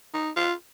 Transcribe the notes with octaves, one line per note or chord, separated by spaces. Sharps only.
D#4
F4